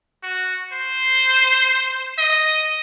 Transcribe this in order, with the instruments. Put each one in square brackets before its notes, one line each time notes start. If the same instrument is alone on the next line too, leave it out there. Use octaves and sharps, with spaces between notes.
[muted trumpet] F#4
C5
D#5